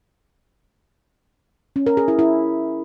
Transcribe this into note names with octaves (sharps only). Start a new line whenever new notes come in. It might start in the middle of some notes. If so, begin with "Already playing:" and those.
C#4
A#4
G#4
E4
E4